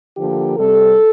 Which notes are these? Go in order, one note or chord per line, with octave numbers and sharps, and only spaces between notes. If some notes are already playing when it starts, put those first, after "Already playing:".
D3 F3 A#3 G4
C3 G3 C4 A4